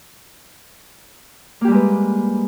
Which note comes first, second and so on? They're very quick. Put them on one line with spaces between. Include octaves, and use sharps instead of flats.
A#3 G4 G3 G#3 B4